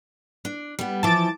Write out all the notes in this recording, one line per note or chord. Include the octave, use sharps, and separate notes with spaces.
D4
G3 B3
E3 F3 A5 D6 A6